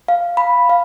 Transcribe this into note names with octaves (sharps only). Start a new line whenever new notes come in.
F5
B5
F5